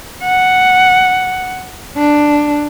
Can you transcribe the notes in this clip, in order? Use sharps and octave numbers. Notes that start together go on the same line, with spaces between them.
F#5
D4